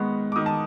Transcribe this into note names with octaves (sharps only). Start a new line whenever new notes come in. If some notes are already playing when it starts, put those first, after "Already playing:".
Already playing: D#3 G#3 B3 C#6
D6
D#3 D#6
A5